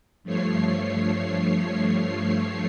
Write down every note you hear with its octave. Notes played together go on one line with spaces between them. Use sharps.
G2 F3 A3 C#5 C7